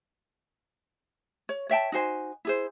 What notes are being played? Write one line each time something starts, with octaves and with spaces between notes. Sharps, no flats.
C#5
C#5 E5 G5 A5
D#4 F#4 C5 G#5
E4 G#4 C5